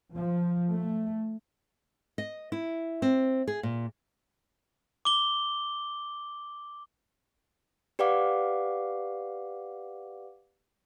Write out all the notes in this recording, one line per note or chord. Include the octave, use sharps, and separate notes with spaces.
F3
A3
D#5
E4
C4
G#4
A#2
D6 G7
G4 B4 D5 F5 F#5 D6